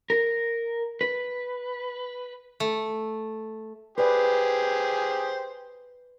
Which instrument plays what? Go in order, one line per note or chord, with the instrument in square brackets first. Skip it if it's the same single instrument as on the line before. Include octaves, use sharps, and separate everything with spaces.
[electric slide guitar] A#4
B4
[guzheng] A3
[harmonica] G4 G#4 C5 [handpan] B4 D5